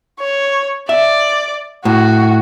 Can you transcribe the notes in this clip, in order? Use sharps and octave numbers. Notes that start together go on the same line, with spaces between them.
C#5
D5 E5
A2 F#4